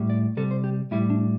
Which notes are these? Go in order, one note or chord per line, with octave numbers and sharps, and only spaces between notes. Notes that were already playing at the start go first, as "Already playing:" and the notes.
Already playing: A2 G3
D5
C3 G3 A4
C5
G4
A2 G3 E4
D4